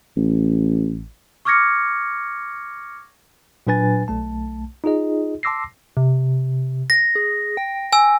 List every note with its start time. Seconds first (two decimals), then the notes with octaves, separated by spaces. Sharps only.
0.16 A1
1.45 C#6 D6 F6 G#6 A#6 C#7
3.67 A#2 F#3 D4 B4 G#5 A6
4.08 B1 A3 A5
4.84 D#4 F4 G#4 D#5
5.43 A5 C6 D6 E6 A#6 C7
5.97 C3
6.90 A#6
7.16 G#4
7.57 G5
7.92 G#5 E6